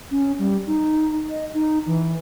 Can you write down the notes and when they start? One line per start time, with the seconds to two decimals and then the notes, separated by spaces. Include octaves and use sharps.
0.11 C#4
0.39 G3
0.67 D#4
1.29 D#5
1.54 D#4
1.87 E3